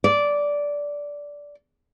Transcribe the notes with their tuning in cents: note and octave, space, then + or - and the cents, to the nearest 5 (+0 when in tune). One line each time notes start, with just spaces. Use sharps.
D5 -10